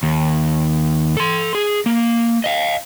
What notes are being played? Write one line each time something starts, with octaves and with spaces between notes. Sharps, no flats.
D#2
A4 C6
G#4
A#3
D#5 F5